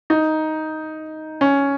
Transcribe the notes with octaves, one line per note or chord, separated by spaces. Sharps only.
D#4
C#4